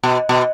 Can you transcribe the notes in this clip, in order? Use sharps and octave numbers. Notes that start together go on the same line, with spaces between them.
B2
B2